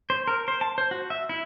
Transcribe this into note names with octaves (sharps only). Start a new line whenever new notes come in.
C5
A#4
C5
A5
C5
F#4
E5
E4